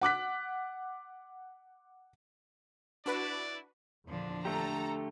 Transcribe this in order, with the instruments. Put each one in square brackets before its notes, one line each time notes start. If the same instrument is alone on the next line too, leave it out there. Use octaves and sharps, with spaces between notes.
[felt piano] F#5 D6 F#6 B6
[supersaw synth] D4 F#4 B4 [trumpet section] E4 D5
[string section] E2 A#2 D3 [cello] F3 D4
[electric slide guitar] D3 A3 G4 [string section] A4 A#5